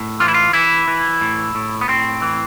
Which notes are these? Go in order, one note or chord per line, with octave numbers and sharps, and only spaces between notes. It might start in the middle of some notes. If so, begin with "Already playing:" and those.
Already playing: A2
E3 F4
E4
F4
E3 E4
E3
A2
A2
B3
A2 C4
E3